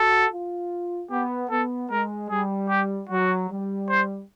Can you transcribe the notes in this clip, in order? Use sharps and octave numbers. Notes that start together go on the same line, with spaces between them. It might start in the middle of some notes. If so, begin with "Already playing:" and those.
Already playing: F#4 A4
F4
B3 G4
B3 A4
G#3 A#4
G3 G#4
G4
F#3 F#4
G3
C5